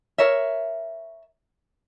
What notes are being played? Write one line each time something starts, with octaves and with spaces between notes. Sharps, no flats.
A#4 C#5 E5